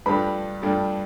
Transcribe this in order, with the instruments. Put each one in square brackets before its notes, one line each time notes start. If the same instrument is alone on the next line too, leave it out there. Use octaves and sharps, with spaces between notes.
[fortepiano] G2 F3 A3 D4 G4 [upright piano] B4 B5
[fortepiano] G2 F3 A3 D4 G4